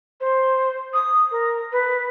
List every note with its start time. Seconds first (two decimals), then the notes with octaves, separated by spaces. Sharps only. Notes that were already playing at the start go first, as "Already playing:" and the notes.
0.20 C5
0.93 D#6
1.31 A#4
1.72 B4